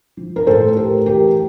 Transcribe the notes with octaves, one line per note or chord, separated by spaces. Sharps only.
F3
A#4
A2 A4 C5
A3 G4 A#4
E3 G4 A#4